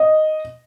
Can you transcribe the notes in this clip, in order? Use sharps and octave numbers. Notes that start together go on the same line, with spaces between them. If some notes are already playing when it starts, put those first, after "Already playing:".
Already playing: D#5